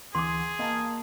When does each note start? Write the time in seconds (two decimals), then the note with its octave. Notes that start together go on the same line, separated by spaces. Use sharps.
0.15 D2 E3 G#4 F#5 C6 D6
0.59 A#3 D#5 F5 A5